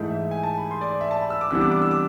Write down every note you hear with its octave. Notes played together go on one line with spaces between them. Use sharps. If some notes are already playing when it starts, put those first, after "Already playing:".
Already playing: G#2 E3 A3
E5
G#5
A5
B5
C6
D5
D5
E5
A5
B5
E6
D6
C2 C3 E3 B3 D4 E6
D6
D6
E6
D6